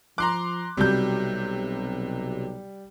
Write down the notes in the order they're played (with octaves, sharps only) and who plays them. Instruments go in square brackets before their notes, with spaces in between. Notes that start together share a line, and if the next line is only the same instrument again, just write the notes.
[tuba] F3 [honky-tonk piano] A#5 C6 D6 [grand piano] F#6
[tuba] B1 [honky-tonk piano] C3 F#3 [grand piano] G3 G6